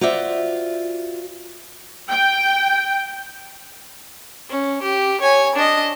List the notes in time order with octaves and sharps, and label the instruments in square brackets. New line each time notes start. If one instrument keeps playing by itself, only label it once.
[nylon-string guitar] F4 F#4 C5 D5 E5
[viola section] G5
[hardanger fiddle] C#4
G4
C#5 G#5
D4 D#5